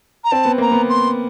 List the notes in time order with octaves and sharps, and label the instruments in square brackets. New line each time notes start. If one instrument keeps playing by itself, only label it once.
[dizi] A#5
[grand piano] C4 [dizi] A5
[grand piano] B3
[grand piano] A#3 [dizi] A#5
[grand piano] B3
[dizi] C6